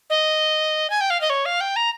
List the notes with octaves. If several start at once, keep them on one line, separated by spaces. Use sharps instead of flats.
D#5
G#5
G5
F5
D#5
C#5
F5
G5
A#5